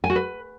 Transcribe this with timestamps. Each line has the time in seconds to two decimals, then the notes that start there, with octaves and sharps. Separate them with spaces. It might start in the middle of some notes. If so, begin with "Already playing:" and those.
0.04 G#5
0.10 F#4
0.16 B4